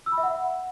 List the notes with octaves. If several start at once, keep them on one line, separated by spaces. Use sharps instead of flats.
E6
B5
E5
F#5